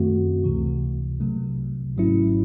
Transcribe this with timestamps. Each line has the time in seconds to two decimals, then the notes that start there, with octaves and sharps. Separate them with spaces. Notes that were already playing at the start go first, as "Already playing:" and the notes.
Already playing: F#2 D#3 A3 C4 F#4
0.44 C#2 C3 E3
1.20 C2 C3 F#3 A3
1.96 G#1 G#2 F#3 C#4 E4